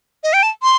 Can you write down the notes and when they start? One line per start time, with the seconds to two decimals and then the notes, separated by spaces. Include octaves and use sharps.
0.23 D#5
0.33 G5
0.43 A5
0.63 C6